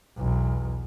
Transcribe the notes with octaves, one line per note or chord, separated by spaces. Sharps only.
B1 E2